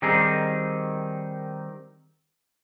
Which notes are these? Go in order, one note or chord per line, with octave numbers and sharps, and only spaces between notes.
D#3 G3 C4 D#4 G#4